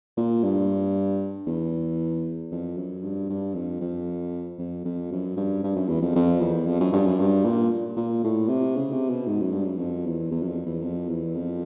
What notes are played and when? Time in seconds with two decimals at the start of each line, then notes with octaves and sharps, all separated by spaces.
0.17 A#2
0.43 G2
1.47 E2
2.52 F2
2.77 F#2
3.03 G2
3.29 G2
3.55 F2
3.81 F2
4.59 F2
4.85 F2
5.12 F#2
5.37 G2
5.64 G2
5.76 F#2
5.88 E2
6.02 F2
6.15 F2
6.41 E2
6.67 F2
6.80 F#2
6.93 G2
7.06 F#2
7.19 G2
7.45 A#2
7.96 A#2
8.24 A2
8.48 C3
8.75 C#3
8.92 C3
9.10 B2
9.27 G#2
9.40 F#2
9.53 G2
9.65 F#2
9.79 F2
10.06 E2
10.31 E2
10.42 F#2
10.48 F2
10.66 E2
10.82 F2
11.09 E2
11.35 F2